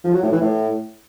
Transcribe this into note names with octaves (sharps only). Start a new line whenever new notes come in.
F3
F#3
A2
E3
A2